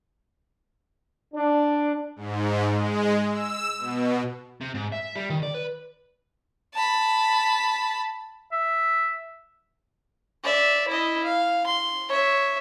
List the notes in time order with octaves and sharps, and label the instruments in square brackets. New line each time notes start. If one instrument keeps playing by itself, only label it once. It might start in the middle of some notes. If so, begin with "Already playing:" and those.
[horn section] D4
[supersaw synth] G#2
G#3
E6
B2
[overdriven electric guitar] C3
G#2
E5
G3
D#3
D5
B4
[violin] A5 B5
[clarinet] E5
[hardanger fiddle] D5 E5
E4 D#5
F5
C6
C#5 E5